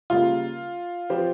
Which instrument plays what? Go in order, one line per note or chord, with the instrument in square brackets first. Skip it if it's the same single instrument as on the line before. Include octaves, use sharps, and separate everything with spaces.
[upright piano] C#3 G3 A#3 [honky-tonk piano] F4
[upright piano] F3 C4 G4 C5